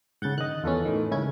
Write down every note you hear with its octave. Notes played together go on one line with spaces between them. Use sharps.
G#2 C#3 F#5 G6 A6
D#3 D#5 F#6
E2 C#4 F4 A4 B4
A2 D#3
G#2 C#3 C#4 E4 G#6